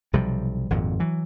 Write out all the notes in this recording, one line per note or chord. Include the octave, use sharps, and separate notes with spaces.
B1 C3 F3 G3
G#1 F2 A#2
E3 F#3